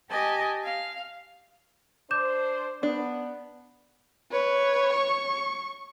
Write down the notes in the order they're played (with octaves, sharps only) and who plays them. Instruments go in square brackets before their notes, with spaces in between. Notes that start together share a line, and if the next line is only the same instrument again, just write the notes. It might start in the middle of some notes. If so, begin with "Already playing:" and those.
[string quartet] G4 D#5 G#5 A5
F5
[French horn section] D4 C5 [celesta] D6 G6 E7
[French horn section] B3 [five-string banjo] D4
[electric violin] B4 [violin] C#5
[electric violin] C#6